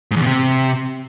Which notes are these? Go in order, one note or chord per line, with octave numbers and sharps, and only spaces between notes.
G#2
E2
B2
C3